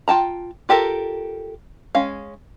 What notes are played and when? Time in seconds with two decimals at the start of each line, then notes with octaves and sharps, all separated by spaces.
0.08 F4 G5 A5 A#5
0.69 F4 G4 A4 A#4
1.95 G#3 C#4 F5